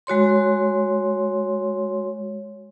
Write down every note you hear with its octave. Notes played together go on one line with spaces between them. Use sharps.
G#3 F#4 C#5 C6